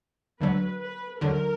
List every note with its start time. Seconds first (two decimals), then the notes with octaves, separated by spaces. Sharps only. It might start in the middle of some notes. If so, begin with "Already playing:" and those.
0.40 D2 D3 F#3 B4
0.81 B4
1.20 D2 D3 F#3 A#4